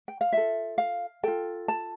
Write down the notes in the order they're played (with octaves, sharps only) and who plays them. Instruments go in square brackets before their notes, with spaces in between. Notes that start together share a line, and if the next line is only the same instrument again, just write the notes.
[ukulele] G5
F5
F4 A4 E5
F5
F4 A4 G5
A5